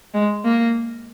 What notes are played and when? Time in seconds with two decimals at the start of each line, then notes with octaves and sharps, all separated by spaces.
0.14 G#3
0.45 A#3